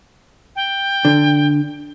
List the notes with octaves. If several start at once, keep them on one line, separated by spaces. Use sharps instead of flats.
G5
D3